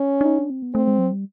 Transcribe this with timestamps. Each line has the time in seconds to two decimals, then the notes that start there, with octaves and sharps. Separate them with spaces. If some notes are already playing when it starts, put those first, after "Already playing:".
Already playing: C#4
0.21 D4
0.25 D#4
0.39 D4
0.50 C4
0.62 B3
0.74 A3 C4
0.87 G#3
0.99 F#3
1.12 G3